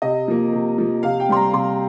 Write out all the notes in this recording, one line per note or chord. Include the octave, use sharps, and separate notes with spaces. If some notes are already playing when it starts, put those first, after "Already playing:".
C3 D#5
F3 A#3
C3
F3 A#3
C3 F5
G5
G3 C4 C6
A#5
C3 C6